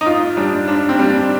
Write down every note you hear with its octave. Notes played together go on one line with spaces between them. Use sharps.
D#4
G#2 F4
G3 D4
G#2 D4
C4
G3
D4